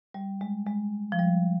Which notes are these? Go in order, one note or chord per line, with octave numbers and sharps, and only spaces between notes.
G3
G#3
G#3
F3
G3